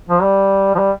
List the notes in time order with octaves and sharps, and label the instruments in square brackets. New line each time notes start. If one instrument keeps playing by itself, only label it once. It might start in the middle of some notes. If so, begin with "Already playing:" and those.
[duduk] F3
G3
F3
G3